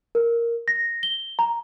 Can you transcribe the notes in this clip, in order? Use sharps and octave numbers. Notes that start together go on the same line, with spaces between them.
A#4
A#6
G7
A#5